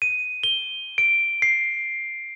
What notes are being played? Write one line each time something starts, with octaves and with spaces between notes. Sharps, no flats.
D#7
G7
D7
C7